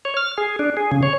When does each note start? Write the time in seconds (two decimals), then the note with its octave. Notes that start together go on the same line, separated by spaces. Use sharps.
0.05 C#5
0.17 F6
0.38 G#4
0.59 D4
0.77 G#4
0.92 C#3
1.03 C#5